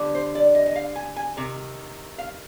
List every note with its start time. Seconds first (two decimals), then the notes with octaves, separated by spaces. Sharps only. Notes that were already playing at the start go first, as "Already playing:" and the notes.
Already playing: D3 G3 B3
0.15 C5
0.35 D5
0.55 D#5
0.66 D#5
0.76 F5
0.96 G#5
1.16 G#5
1.37 C3 D#3
2.18 F5